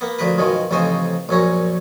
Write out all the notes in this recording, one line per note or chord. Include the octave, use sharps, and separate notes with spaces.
A#3 B3
D2 F3 A#4 B4
F#2 B2 D#3 F3
A1 F2 C#3 D#4 C5 G#5
A#1 F#2 C#4 A#5